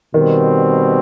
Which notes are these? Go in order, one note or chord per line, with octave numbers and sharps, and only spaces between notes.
B2 D#3 G3 C4